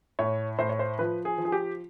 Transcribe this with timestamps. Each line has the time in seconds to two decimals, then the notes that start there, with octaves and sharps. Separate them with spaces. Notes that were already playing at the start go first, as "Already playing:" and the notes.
0.19 A2 C#5
0.59 A2 C5
0.69 C#5
0.79 C5
0.99 F3 B4
1.25 G#4
1.38 F3
1.45 G#4
1.52 G4